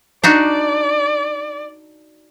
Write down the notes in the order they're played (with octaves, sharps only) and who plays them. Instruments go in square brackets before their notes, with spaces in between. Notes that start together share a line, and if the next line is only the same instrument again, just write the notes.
[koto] D4 D#4 F#4 [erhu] D5